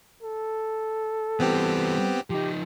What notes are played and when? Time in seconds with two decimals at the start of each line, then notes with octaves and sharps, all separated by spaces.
0.23 A4
1.40 E3 G3 B3 C4 G4
2.30 F3 D#4 G4